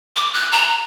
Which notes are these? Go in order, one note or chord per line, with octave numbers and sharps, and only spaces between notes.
D6
F#6
A#5